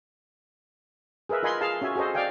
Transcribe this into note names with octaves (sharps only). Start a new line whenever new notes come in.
G#4 A#4 B4 E5
F4 A#4 D#5 G#5 B5 C6
G#4 F5 A5
C#4 F#4 E5 G#5
F#4 G#4 A4 C5 D#5
D5 D#5 F5 G5 G#5